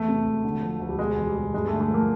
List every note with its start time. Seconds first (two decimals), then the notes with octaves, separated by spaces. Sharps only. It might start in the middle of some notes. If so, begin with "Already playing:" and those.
Already playing: E2 A3
0.08 C3
0.26 E1
0.44 D3
0.62 F3
0.80 D2
0.89 G3
0.99 B2 G#3
1.17 E2
1.27 G3
1.35 B2
1.54 G2 G#3
1.68 A3
1.72 D3
1.81 A3
1.91 F3 A#3